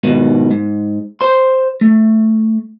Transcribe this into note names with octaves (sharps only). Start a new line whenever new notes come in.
G#2 B2 D#3
G#2
C5 C6
A3